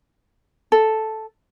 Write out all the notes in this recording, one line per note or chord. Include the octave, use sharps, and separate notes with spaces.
A4